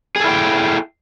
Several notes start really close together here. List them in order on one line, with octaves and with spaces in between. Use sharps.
G#4 A4 E4 G5